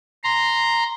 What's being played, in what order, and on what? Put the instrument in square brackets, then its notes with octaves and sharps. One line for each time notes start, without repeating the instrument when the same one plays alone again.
[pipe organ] A#5 C6